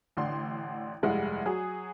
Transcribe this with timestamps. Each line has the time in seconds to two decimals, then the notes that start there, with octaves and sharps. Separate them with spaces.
0.17 A1 D3 C6
1.03 F1 G2 G#3 E4 F#5
1.46 F#3 G#4